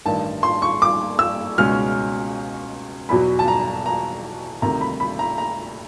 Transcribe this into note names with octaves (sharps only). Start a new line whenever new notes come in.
A1 G2 D#3 A5
C6
C#6
D6
E6
C#2 B2 G#3 C#4 F6
E2 B2 F#3 B5
A5
A#5
A#5
D2 C3 D#3 A#5
B5
B5
A#5
A#5